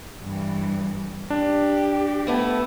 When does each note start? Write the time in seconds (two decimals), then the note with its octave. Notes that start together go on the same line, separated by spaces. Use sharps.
0.21 G2 E3
1.30 D4 G4
2.27 A3 B3 E4